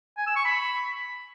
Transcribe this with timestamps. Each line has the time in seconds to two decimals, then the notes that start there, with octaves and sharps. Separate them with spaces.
0.17 G#5
0.27 E6
0.36 C#6
0.45 B5